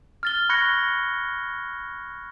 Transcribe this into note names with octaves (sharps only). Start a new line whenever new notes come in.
F6 A6 G7
B5 C#6 F#6 G#6 A#6 C#7